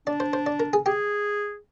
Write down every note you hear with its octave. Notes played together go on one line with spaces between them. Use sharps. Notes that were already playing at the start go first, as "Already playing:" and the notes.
D4 D5
C5
C5
D5
A#4
G#4
G4 G#4